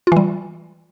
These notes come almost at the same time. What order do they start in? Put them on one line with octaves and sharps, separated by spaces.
F4 E3 G3